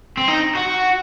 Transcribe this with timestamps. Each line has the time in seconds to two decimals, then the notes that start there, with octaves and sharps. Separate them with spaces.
0.17 C4
0.28 D#4
0.55 F#4